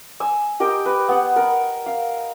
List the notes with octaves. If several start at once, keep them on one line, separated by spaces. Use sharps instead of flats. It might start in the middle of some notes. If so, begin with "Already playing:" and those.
G#5 E6
G4 A#4 D#5 G5
B4
B3 F#5
A#4
F5